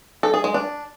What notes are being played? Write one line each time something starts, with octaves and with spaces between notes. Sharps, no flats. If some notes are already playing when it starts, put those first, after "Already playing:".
A4
G#4
G#3
D4